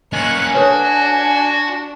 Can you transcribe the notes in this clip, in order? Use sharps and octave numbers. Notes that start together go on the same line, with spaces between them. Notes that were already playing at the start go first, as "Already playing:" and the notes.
A#3 C#4 D#5 G#5 C#6 F#6
D4 F#4 A4 B4 C#5